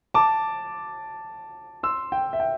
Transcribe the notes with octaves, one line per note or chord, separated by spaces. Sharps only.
A5 D6
C6 E6
G5
E5
G5